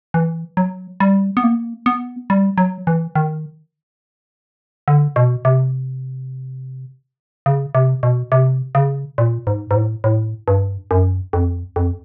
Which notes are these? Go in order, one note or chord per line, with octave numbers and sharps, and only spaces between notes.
E3
F#3
G3
B3
A#3
B3
G3
F#3
E3
D#3
D3
B2
C3
C#3
C3
B2
C3
C#3
A#2
G#2
G#2
A2
A2
G2
F#2
F2
F2